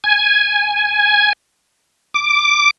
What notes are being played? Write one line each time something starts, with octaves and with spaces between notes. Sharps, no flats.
G#5
D6